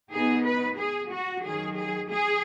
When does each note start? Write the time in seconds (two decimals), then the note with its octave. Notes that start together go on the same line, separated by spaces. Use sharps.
0.12 B2 B3 D#4 G#4
0.45 B4
0.78 G#4
1.12 F#4
1.44 F#2 D#3 F#3 G#4
1.76 G#4
2.10 G#4